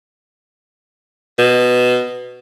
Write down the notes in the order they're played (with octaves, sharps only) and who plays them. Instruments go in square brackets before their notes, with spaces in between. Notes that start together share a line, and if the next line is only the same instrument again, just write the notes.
[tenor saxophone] B2